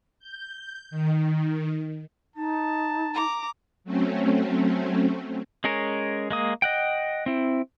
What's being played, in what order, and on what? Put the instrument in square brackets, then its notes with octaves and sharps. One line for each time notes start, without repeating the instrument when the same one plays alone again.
[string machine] G6
D#3
[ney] D#4 [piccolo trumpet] A5
[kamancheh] A#5 D6
[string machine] F#3 A3 C4 C#4
[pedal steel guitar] G#3 C#4 G#4 A#4 C#5
G#3 A#3 D#6
D#5 F#5 G5
C4 E4